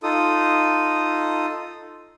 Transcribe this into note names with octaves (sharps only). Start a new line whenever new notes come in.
D#4 F4 A4 D#6